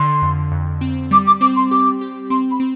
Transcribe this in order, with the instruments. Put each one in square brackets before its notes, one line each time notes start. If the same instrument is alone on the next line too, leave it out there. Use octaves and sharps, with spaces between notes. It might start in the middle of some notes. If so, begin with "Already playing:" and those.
Already playing: [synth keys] D3 [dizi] C6
[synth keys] F2
F2
C4
[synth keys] G3 [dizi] D6
[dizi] D6
[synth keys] C4 [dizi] D6
[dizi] C6
[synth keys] G4 [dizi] D6
[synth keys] G4
[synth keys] C4 [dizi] C6
[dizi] B5
[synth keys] C4